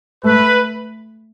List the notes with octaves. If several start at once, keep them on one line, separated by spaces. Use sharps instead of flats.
A3 B4